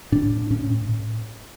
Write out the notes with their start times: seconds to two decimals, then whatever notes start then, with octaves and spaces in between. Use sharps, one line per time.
0.12 A2 D4
0.31 A2
0.50 A2 C#4
0.71 A2
0.89 A2